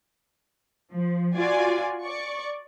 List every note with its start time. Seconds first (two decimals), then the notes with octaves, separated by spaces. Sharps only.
0.91 F3
1.35 F4 F#4 D5 G#5
2.02 D5 C#6